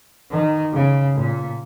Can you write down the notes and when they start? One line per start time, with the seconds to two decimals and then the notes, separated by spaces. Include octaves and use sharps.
0.31 D#3
0.73 C#3
1.15 A#2